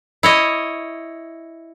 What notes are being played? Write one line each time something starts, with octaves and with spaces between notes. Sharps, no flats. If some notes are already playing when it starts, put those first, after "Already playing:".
E4 C#5 D#5